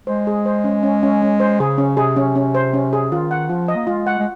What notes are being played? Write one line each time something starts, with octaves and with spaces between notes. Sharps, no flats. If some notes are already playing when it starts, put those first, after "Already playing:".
G#3 C5
G#4
C5
C#4
C#4
C#4
C#4
C5
C#3 G#4
C#4
C3 G#4
C#4
C#4
C5
C#4
G#4
D#3 F4
F#5
F3 F4
D#5
A#3
G#3 F4
F#5
G#3